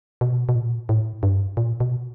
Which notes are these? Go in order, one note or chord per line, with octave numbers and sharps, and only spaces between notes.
B2
B2
A#2
A2
G2
A#2
B2